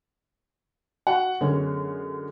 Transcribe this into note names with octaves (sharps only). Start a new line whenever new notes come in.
F#4 F#5
F#2 D3 G#3 B3 C#4